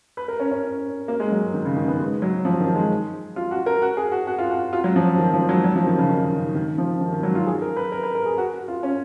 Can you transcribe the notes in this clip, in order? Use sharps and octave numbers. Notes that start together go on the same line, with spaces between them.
B4
A#4
C#4
C#4
A#3
G#3
F#3
D#3
C#3
D#3
B3
G#3
F#3
F3
D#3
G#3
F4
F#4
A#4
F#4
G#4
F#4
F#4
F4
F#4
F4
F#3
F3
D#3
F3
F#3
F#3
F3
D#3
C#3
D#3
D#3
D#3
F3
D#3
D#3
F#3
F4
G#4
A#4
B4
A#4
B4
A#4
G#4
F#4
F4
C#4